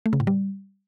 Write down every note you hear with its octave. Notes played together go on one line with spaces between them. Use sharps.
A3
C#3
A2
G3